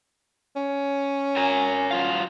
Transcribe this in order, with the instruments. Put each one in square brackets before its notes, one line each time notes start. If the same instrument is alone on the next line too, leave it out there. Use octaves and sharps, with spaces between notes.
[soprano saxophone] C#4
[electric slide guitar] A#4 G#5
F#3 F4 F5